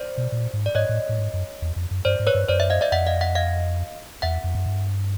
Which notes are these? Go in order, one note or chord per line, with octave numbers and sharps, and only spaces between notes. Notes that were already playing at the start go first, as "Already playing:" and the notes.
Already playing: C5 D5
B2
A#2
G#2
D5
G#2 C#5 D#5
A2
A2
G#2
F#2
E2
F2
F#2
G2 C5 D5
G#2
B4 C#5
G2
F#2 C5 D5
D5 E5
D#5 F5
D5 E5
F2 E5 F#5
D#5 F5
E5 F#5
D#5 F5
E2 E5 F#5
F2
F#2
G2